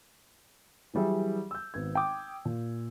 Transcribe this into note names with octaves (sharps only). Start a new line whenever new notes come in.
E3 F#3 G3 G#4 E5
E6 G6
G#1 B3 G#6
G5 D6 D#6
A#2